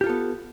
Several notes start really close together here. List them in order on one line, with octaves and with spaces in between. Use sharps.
G4 F4 A4 B3